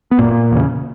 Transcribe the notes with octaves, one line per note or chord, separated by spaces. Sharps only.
B3
F#1 A#2 A#3
E2 C#3